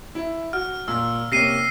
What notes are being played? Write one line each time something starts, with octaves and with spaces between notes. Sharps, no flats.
E4
F#4 F6
A#2 E6
C3 A#3 C#4 A#6 C7 D#7